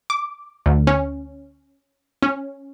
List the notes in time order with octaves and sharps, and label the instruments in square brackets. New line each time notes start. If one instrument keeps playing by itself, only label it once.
[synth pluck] D6
D2
C#4
C#4